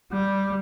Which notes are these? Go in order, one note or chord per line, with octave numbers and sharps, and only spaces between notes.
G3